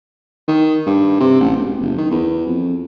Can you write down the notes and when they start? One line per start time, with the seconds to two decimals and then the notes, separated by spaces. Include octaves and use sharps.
0.48 D#3
0.86 G2
1.20 C3
1.41 A1
1.57 E1
1.81 F#1
1.98 D#3
2.11 E2
2.47 F2